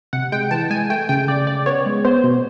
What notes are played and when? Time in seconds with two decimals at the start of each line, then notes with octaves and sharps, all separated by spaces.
0.13 C3 F#5
0.32 G#3 G5
0.51 E3 A5
0.70 G#3 G#5
0.90 A3 G5
1.09 C#3 G5
1.28 C#3 D5
1.47 C#3 D5
1.66 B3 C#5
1.86 G#3
2.05 B3 C5
2.24 B2